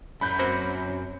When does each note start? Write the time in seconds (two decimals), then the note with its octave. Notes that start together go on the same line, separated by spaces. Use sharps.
0.21 F#2 B5 G6
0.39 A#3 C4 F#4 C5